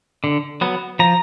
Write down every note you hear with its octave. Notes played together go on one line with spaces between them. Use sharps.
D3
F#3 B3
F3 A#5